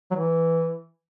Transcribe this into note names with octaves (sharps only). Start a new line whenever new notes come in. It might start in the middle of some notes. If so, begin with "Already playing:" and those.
F#3
E3